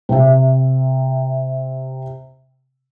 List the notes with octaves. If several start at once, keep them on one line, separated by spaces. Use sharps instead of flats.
C3 E5